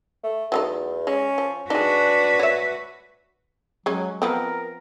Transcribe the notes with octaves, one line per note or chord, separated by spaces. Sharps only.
A3
E2 F#3 A3 D#4
G#3 C#4
F3
D4 D#4 F#4 G#4 B4
C#5 E5
F#3 G#3 C#4
F3 B3 C4 A#4